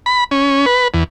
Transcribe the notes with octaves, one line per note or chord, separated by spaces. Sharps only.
B5
C#4
B4
E2